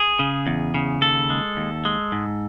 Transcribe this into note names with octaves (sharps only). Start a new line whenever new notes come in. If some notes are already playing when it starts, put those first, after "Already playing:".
Already playing: G#4
C#3
E2
C#3
D#2 A4
G#3
D#2
G#3
G#2